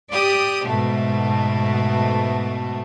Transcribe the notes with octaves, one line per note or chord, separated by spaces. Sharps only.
G4 D5 D#6
G#2 B2 A3